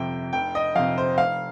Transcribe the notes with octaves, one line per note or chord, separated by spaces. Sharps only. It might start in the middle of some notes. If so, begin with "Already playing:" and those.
Already playing: G1 F2 C3 G5
F1 G5
D#5
F2 C3 F5
C5
F1 F5